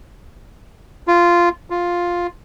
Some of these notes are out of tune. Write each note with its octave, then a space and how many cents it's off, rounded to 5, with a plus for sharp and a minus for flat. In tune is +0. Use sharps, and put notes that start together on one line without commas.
F4 -10
F4 +5